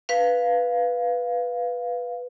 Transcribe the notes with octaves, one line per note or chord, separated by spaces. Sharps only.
B4 F5